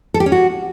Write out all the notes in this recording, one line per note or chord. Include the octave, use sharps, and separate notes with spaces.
A4
G4
C#4
F#4